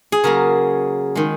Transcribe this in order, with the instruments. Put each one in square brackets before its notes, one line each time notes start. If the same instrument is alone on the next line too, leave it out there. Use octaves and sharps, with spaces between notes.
[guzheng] G#4
C#3 F#3 A#3 A#4
D#3 G#3